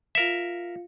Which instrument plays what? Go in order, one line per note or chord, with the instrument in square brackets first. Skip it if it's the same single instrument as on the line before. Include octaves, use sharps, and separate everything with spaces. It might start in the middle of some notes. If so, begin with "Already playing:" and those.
[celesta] F4 F5 C#7 [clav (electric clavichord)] A#4 E5